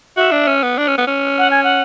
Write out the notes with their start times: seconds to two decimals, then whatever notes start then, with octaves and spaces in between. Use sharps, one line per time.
0.17 F#4 E5
0.32 D4
0.47 C#4
0.63 B3
0.78 D4
0.88 C#4
0.98 B3
1.07 C#4
1.38 F#5
1.51 G#5
1.64 F#5